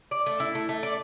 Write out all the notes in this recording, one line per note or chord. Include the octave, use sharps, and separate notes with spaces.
D5
A3
E4
A3
A3
D5